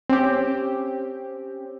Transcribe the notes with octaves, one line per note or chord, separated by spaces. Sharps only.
C4 C#4 G4